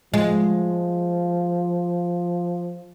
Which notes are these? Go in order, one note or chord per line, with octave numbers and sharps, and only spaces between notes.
F3 G#3